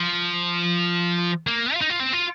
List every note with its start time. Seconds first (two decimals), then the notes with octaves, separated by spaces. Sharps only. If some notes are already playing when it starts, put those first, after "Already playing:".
Already playing: F3
1.47 A#3
1.74 F4
1.81 D#4
1.90 F4
2.00 C4
2.13 F4